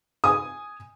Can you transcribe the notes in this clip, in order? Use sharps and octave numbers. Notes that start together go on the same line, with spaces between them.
G#5 D#6